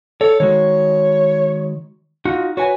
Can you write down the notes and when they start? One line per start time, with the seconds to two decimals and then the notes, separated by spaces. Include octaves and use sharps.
0.21 A4 C#5
0.40 D#3 G#3 F#4 C#5
2.25 D#4 F4 F#4
2.57 F#4 B4 C#5 G#5